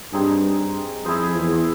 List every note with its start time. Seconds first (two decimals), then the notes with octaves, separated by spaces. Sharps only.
0.13 G2 C4 D#4 G#4
1.05 F2 E4 G#4 C5 D#5
1.35 E2